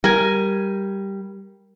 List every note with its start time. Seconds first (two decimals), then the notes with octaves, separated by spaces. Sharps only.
0.04 G3 A#4 G#5